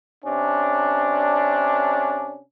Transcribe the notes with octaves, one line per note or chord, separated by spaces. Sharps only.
C3 C#4 D4